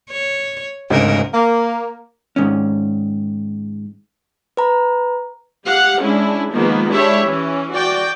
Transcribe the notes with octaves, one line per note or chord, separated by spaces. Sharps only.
C#5
G#1 D2 G#2 C#3 A#4
A#3
G#2 D#3 C#4
B4 A#5 B5
G4 F5 F#5
G#3 C#4 D4 E4
D#3 F3 G#3 A#3 B3
G#3 D4 E4 G4 C#5 E5
E3 C#4
F#4 D5 G5